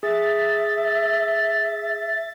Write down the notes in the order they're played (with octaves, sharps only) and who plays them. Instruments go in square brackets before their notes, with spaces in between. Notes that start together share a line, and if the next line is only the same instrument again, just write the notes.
[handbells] G#4 [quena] E5 [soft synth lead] A6